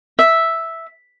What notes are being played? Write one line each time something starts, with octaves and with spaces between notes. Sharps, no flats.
E5